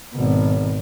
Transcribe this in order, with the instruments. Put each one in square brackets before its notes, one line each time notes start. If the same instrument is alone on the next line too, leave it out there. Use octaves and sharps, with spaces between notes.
[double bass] G#1 B2